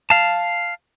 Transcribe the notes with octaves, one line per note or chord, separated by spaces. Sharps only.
F5 A5